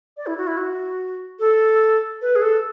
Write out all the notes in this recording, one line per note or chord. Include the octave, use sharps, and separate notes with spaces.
D5
E4
F#4
E4
F#4
A4
B4
G#4
A4